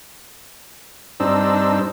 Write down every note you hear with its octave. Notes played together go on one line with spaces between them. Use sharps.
G2 C4 D4 D#4 E6